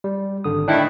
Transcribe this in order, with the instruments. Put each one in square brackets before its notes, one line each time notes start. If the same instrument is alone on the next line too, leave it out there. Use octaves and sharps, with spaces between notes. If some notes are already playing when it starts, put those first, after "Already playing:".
[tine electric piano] G3
G#1 D3 D#6
[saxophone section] A2 D#3 E4 [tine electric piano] D4 G5 F#6